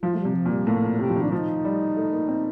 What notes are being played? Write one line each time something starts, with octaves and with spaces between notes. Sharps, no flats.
F3 F4
A3
G3
C3
F3
A#2
G3
A2 A#3
A#2
C3 G4
F3
D#3
D4
F3 D#4
G3
A3
A#3
C4